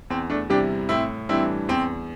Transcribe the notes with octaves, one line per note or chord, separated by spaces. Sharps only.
E2 C4
A3 D4
C3 G3 D4 E4 G4
A2 C4 E4
E3 G3 C4 D4 E4
E2 C4